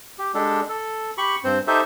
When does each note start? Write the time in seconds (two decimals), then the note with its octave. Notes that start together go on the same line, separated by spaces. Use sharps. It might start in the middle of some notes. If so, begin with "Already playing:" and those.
0.18 G4
0.34 G#3 D4 G4 A4
0.69 A4
1.18 G4 B5 C#6
1.44 G2 C4 C5
1.67 D#4 G4 A4 C5 E5